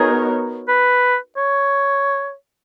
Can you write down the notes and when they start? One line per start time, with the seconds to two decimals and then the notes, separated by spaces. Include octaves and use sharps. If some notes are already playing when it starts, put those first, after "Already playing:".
Already playing: B3 D#4 F#4 G#4 A#4 C#5
0.68 B4
1.37 C#5